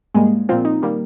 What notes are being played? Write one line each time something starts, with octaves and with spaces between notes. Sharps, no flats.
G#2 G3 G#3 A#3 G#4
A#2 F3 C4 F4
D#4
D#3 G3 A#3